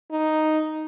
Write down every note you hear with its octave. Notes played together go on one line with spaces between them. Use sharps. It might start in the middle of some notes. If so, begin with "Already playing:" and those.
D#4